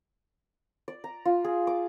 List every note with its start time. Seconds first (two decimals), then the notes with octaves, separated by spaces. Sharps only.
0.88 D5
1.04 A#5
1.25 F4
1.44 G#4
1.67 D6